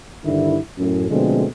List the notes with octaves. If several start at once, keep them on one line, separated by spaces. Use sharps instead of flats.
G2 D3 D#3 E4
F#2 A2
B2 D3 F3 G#3 A3 C4